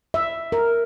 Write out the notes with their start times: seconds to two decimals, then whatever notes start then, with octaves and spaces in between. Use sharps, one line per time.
0.14 E5
0.52 A#4